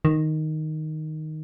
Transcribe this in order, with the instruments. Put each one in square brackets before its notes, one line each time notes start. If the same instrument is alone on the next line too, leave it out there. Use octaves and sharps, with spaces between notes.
[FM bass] D#3